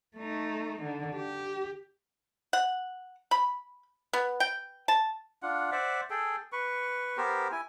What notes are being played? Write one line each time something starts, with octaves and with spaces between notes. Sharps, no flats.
A3 D#4
D3
G4
F#5
B5
B3
G5
A5
D4 F4 F#5
C5 D5 E5 F#5
G#4 A4 G5
B4 C#6
B3 G4 A#4 C5
E4 G#5